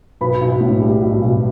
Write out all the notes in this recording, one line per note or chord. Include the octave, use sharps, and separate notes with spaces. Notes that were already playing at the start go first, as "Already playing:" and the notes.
B1 B4 B5
B1
A2
G3
B1
B1